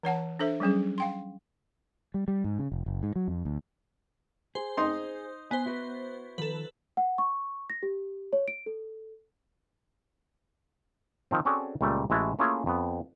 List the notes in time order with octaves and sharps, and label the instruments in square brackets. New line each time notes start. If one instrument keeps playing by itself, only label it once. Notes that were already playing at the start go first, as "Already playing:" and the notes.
[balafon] E3 C#5 F#5 A5
D4 A4 C5 E5
F#3 G3 C#4 G#4
F5 G5 C6
[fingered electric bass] G3
G3
G#2
C#3
F1
F#1
G#2
F#3
F2
D2
[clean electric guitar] G#4 [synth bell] C5
[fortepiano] D#4 C6
[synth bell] B3 C5 [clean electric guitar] G#5
[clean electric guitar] E4 F#4 B4
[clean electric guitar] D#3 F3 [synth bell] A4 B4
[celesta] F#5
C#6
A#6
G4
C#5
D7
A4
[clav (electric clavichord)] D#3 F3 C4
C4 C#4 F#4 G#4 A4 D5
C#2 A#2 G3 A3 D5
A1 G#3 E4 F#4 E5 A5
A3 A#3 C#4 E4 F4 G#4
F2 B3